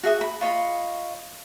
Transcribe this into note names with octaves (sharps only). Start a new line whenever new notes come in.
F#4 G#4 E5 D#6
B5
F4 C#5 D#5 B5